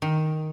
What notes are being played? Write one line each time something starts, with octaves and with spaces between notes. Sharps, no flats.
D#3